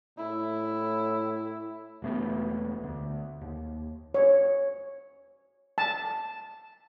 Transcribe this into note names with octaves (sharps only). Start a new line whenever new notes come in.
A2 E4
E1 A3 B3
D2
D#2
C#5
A5